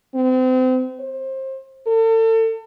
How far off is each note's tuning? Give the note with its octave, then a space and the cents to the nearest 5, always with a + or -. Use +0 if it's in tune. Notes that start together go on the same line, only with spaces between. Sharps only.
C4 -35
C5 +25
A4 +35